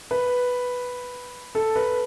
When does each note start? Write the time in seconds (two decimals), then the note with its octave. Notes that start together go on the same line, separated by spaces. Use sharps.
0.11 B4
1.55 A4
1.76 B4